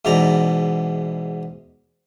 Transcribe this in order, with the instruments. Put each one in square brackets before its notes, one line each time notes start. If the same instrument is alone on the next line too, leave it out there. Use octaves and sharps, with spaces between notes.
[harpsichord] E2 G#2 B2 D5 A#5